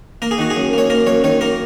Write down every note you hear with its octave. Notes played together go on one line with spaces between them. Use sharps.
A#3 A#4
G#4
D#3 F#4
G#4
F#2
A#3 C#5
A#3 A#4
F#2 C#5
D#3 C#5
A#3 A#4